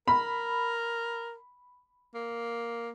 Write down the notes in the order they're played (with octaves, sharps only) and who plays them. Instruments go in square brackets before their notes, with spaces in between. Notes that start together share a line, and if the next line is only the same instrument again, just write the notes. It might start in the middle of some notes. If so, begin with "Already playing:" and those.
[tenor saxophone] A#4 [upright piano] B5
[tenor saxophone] A#3